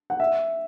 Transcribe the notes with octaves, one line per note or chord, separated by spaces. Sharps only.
F#5
E5